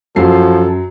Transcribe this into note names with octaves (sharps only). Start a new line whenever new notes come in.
F#2 F3 F#3 A4 C7